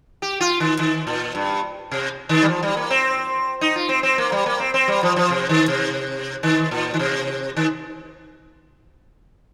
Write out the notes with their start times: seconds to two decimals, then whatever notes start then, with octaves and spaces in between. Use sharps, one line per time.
0.22 G4
0.41 F4
0.60 D#3
0.79 D#3
1.07 A#2
1.35 G2
1.92 C3
2.29 D#3
2.42 G3
2.48 F3
2.63 G3
2.77 A#3
2.90 C4
3.61 D#4
3.76 F4
3.89 C4
4.03 C4
4.18 A#3
4.32 G3
4.46 A#3
4.60 C4
4.74 C4
4.88 G3
5.03 F3
5.16 F3
5.30 C3
5.49 D#3
5.68 C3
6.43 D#3
6.71 A#2
6.94 D#3
6.99 C3
7.57 D#3